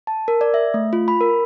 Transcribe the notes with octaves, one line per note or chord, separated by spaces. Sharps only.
A5
A#4
D5
E5
A3
F4
B5
A#4